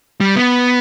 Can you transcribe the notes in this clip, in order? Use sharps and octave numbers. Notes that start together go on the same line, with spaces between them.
G3
B3